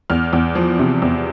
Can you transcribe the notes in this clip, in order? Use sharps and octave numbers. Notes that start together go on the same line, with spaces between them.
E2 F6
E2
F3
C3
E2